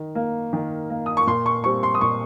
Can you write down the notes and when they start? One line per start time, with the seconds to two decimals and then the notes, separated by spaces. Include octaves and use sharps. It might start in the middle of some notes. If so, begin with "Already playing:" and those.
Already playing: D#3
0.15 A#3
0.53 D#3
0.90 A#3
1.06 D#6
1.17 C#6
1.27 A#2 C6
1.46 C#6
1.64 G3 C4 C#6
1.83 C6
1.95 D#6
2.01 A#2 C#6